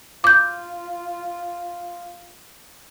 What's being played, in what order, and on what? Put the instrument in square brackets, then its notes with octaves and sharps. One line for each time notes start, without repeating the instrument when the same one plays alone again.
[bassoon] F4 [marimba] D6 G6